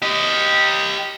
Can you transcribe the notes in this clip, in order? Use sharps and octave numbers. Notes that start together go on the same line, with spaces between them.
G4 D#5